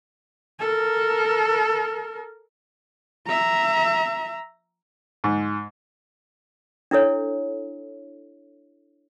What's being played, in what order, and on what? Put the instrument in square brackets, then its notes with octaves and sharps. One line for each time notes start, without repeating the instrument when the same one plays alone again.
[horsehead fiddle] A4 A#4
E5 A#5
[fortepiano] G#2
[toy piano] D4 E4 A4 C#5